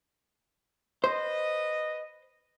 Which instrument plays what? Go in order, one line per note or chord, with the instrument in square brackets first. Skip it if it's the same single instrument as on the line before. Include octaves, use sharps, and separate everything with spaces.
[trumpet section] B4 D#5 [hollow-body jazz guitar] C5